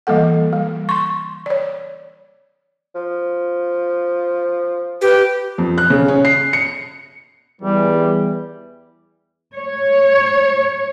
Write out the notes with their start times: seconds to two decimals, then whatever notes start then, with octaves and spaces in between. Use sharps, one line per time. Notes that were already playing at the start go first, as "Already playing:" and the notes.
0.07 E3 G3 A#3 A4 F#5
0.53 G3
0.89 C6 C#6
1.46 C#5 D5
2.95 F3
5.02 G4 B4
5.58 F2
5.78 F#6
5.90 C#3
6.08 C#4
6.25 C7
6.53 C#7
7.61 E2 E3 G3
9.55 C#5